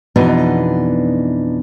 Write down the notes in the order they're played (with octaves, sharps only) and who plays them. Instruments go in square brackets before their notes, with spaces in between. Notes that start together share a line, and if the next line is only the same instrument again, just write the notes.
[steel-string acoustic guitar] F2 B2 E3 B3 D4 D#4